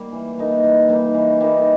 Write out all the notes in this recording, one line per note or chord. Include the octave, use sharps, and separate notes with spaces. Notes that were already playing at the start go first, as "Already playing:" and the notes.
Already playing: G3 A#3
E3
G3 A#3 D#4
E3
G3 A#3 D#4
E3
G3 A#3 D#4